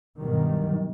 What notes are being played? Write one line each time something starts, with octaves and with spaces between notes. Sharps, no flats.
G2 B2 D#3 F#3 G3